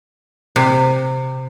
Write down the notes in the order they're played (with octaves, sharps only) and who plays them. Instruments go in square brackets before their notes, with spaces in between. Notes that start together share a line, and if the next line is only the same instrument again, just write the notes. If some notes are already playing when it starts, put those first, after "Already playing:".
[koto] C3